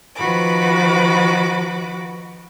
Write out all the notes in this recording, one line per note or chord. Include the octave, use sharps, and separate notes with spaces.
D#3 F3 F#4 B4 B5 D6